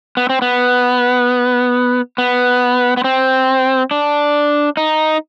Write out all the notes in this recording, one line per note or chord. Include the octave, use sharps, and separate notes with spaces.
B3
C4
B3
B3
B3
C4
D4
D#4